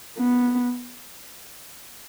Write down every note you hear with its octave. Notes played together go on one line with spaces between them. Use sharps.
B3